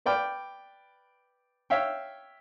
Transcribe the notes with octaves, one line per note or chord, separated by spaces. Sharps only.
B4 D5 G5 B5 F6
C#5 E5 F5 G5